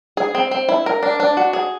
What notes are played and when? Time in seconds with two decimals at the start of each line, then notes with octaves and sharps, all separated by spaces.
0.17 G#4
0.35 C4
0.51 C4
0.69 E4
0.86 A#4
1.03 D4
1.20 D4
1.37 F#4
1.53 G#4